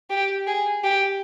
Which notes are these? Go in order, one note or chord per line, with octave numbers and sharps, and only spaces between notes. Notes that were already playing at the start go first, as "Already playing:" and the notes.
G4
G#4
G4